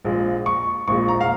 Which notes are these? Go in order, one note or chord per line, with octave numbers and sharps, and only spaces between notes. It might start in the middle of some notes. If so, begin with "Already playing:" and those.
A#1 A#2 G#3
C#6
A#1 A#2 G#3 C#6
A#5
F5